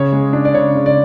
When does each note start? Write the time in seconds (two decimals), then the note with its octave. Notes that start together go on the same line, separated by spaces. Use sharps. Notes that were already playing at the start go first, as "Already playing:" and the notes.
Already playing: C#3 C#5
0.13 G#3
0.33 D4
0.45 D5
0.55 C#3 C#5
0.75 C#3
0.86 D5